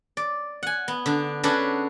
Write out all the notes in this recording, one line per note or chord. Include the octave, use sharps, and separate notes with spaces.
D5
F#5 G#5
B3
D3 D4
C#4 D4 F#4 G#4 A4 B4